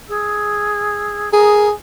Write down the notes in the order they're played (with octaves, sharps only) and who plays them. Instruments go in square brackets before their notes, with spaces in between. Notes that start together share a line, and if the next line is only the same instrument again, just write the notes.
[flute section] G#4 E6
[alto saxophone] G#4 [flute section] A#4 A#5 D#6